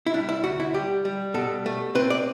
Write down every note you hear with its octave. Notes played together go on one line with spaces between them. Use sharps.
E4
G3 D4
E4
D2 F#4
E4
G3 G4
G3
B2 A4
A3
C4 B4
D5